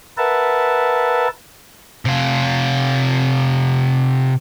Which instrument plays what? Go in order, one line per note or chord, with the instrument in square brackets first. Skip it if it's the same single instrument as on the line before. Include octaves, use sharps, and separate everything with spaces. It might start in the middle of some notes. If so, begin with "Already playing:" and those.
[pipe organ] A#4 B4 E5 F#5 A5
[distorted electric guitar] C3 F4